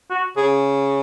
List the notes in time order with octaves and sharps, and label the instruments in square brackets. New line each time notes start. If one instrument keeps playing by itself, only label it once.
[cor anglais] F#4
[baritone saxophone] C#3 [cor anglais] G#4